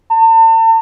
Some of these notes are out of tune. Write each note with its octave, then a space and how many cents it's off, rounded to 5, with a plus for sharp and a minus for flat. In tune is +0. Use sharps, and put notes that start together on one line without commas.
A5 +40